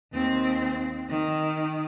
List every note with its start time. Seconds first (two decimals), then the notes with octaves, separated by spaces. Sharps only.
0.13 D#2 C4
1.09 D#3